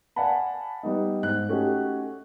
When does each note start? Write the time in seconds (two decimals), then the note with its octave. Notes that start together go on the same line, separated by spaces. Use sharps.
0.16 D5 F5 F#5 G#5 A5 B5
0.83 G3 B3 D#4
1.22 G#2 F#6
1.49 A3 C#4 D#4 F#4 G4